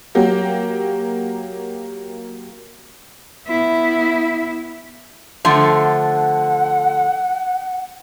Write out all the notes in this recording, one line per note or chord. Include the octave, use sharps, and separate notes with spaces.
F#3 A#3 G4
B3 E4
D3 F3 A3 F#5